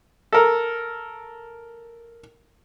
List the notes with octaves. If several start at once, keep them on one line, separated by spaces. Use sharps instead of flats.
A4 A#4